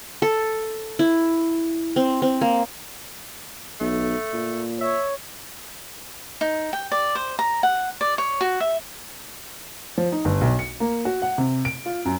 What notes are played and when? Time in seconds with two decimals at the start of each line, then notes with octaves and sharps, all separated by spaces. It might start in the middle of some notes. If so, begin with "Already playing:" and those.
0.22 A4
0.99 E4
1.96 C4
2.22 C4
2.41 A#3
3.80 B1 A3
4.33 A#2
4.81 C#5 E5
6.41 D#4
6.73 G5
6.91 D5
7.15 C5
7.39 A#5
7.63 F#5
8.01 D5
8.18 C#5
8.41 F#4
8.60 E5
9.98 F3
10.12 D#4
10.25 G1
10.41 B1
10.59 C#7
10.80 A#3
11.05 F#4
11.22 F#5
11.38 C3
11.65 D7
11.86 F4
12.05 F#2